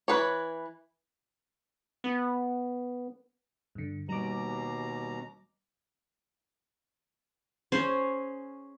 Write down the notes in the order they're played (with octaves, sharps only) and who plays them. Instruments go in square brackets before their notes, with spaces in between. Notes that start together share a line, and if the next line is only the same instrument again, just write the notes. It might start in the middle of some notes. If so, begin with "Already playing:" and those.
[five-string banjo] E3 B4 C#5
[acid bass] B3
[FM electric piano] G2 D3
[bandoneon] D#2 B2 A#5 [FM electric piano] G3 D6
[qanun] C#4 G#4 C5